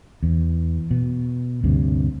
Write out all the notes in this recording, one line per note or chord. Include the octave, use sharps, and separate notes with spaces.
E2
B2
D2 G2 C3